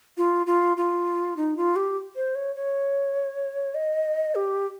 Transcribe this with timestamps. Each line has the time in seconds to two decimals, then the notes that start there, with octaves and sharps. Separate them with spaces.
0.17 F4
0.47 F4
0.77 F4
1.37 D#4
1.57 F4
1.76 G4
2.16 C5
2.35 C#5
2.56 C#5
3.75 D#5
4.35 G4